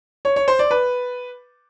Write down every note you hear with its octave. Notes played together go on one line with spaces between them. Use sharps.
C#5
C#5
C5
D5
B4